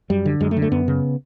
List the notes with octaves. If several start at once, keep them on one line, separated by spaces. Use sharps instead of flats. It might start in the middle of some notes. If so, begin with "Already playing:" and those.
F#2 G3
D3
F#2 G#3
A3
D3
A3
F#2 B3
C#3